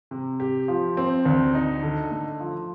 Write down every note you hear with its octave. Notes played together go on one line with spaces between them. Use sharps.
C3
G4
F3
C4
D2
D#4
D3
A3
F3